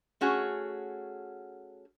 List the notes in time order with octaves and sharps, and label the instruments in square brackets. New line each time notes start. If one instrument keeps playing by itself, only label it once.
[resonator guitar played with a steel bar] A3 C#4 F#4 G#4